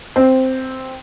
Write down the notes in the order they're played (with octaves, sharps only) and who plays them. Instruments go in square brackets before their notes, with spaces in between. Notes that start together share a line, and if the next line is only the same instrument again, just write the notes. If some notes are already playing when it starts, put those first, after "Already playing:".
[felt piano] C4